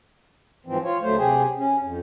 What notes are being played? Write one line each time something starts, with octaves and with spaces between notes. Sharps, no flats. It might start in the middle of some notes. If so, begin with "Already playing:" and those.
G#2 E3 F3 C4
F4 C#5
D2 F#3 A3 C5
C3 G4 G#4
C#4
F2